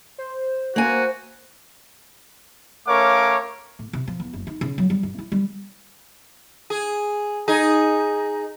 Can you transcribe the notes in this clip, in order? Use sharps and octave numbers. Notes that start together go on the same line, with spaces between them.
C5
A#3 F#4 G#5
A3 C#4 A#4 C#5 F5 D6
A2
C3
F3
E2
F#1
D#4
C#3
F#3
G3
G2
E4
G3
G#4
D#4 G#4